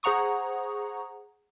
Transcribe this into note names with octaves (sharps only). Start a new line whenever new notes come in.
G#4 C5 F#5 A#5 C#6 D#6